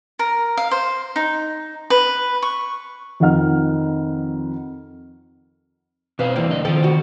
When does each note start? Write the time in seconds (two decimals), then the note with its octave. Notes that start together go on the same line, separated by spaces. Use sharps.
0.19 A#4
0.57 F5
0.71 C5
1.16 D#4
1.90 B4
2.42 C#6
3.20 F2 D#3 D#4 F#5 F6
6.19 B2 C4 B4 C5 F5
6.36 E2 E3 G3 A#3 C4
6.50 D3 D#5
6.65 D#3 F3 C4 A4
6.83 D2 F#4